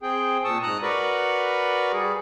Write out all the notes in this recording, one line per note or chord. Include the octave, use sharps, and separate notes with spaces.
C4 G#4 G5
A#2 A5 C#6 D#6 E6
G#2 A#5 D#6 F#6
F#4 A#4 B4 D5 B5 C#6
G3 G#4